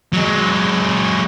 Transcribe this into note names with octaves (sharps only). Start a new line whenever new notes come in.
F#3 G#3